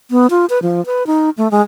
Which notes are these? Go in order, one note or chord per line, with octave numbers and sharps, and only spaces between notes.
B3
F4
B4
F3
B4
D#4
A3
G#3